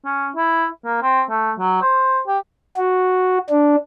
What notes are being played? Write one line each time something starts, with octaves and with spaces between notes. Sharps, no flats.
C#4
E4
A#3
C4
A3
F#3
C5
G4
F#4
D4